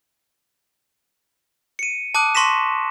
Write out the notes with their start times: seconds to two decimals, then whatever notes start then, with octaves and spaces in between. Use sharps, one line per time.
1.79 C#7 D#7
2.15 A5 D6 D#6 F#6
2.35 A5 C6 C#6 A#6 B6 E7